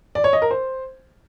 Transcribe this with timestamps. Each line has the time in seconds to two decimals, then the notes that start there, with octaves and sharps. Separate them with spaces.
0.15 D5
0.24 C#5
0.33 D#5
0.42 A#4
0.51 C5